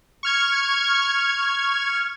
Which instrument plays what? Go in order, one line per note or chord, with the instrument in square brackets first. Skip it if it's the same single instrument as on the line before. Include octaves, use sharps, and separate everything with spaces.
[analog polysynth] C#6 F6 G#6